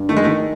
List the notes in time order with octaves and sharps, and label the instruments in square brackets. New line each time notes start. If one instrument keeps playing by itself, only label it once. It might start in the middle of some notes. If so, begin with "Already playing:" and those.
Already playing: [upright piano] G2
[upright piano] D#3 [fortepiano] A3
[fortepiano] G#3
A3
[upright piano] D#3